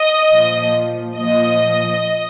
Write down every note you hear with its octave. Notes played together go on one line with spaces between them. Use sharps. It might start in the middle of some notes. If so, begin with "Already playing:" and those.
Already playing: D#5
A#2 F3
A#2 F3 D#5